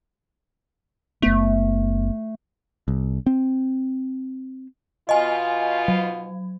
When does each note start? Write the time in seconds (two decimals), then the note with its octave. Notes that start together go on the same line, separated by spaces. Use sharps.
1.22 F#1 A3 B3
2.88 C2
3.26 C4
5.09 B2 F4 D#5 G#5
5.88 F#3